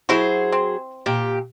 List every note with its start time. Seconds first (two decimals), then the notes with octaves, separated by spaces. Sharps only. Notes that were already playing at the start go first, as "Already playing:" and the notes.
0.09 F#3 E4 F#4 G#4 C5
0.52 C4
1.06 A#2 G4